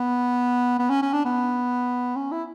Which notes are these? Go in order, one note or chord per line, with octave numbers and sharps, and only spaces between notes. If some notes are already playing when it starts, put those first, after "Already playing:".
Already playing: B3
B3
C#4
C#4
D4
B3
C#4
E4